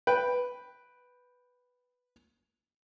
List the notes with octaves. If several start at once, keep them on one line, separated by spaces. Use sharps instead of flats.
B4 G5